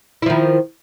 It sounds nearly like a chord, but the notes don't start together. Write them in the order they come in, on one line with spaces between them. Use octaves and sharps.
E4 F3 D#3